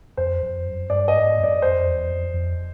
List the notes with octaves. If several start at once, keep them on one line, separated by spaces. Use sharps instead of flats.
F2 C5
F2
F#2
G2 D5
D#5
G#2
F#2
D5
F2 C5
E2
F2
F2